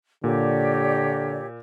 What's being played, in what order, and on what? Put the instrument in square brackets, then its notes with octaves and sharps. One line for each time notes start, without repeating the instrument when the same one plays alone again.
[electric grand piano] A#2 [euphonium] D3 [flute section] G4 C#5 D5